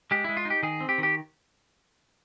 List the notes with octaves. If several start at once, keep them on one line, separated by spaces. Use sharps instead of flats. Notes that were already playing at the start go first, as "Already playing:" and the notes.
G#3 G4
G#3 E4
F4
D#4
G4
D#3 G#4
C4
G4
D#3
G4